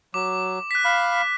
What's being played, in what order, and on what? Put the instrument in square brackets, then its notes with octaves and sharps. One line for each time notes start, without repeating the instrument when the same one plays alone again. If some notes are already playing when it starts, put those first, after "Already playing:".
[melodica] F#3 [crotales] D6
[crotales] F#6 B6
[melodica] F5 B5